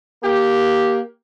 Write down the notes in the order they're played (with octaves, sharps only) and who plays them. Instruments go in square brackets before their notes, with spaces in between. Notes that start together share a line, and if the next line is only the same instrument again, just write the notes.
[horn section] A#3 G4